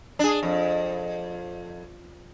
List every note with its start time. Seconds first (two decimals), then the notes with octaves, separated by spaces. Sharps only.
0.19 D4 G#4
0.43 F2